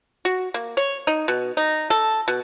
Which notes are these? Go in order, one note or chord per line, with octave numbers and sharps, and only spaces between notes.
F#4
A#3
C#5
D#4
B2
D#4
A4
B2